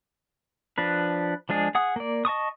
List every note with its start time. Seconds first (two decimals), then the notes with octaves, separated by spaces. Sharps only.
0.78 F3 D4 B4
1.49 F3 G#3 D4 G#4
1.75 G#4 F#5 D#6
1.96 A#3 D5
2.25 D#5 A5 C#6 D#6